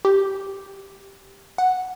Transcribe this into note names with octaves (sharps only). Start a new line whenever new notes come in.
G4
F#5